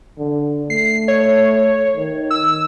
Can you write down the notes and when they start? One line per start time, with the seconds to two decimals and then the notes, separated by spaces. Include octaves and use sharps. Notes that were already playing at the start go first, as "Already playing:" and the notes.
0.18 D3
0.70 A3 C7
1.08 C#5
1.97 D#3
2.31 E6